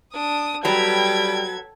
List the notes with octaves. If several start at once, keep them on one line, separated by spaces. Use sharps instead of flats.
D4 D#6
F#3 G3 B3 A4 G5 G#6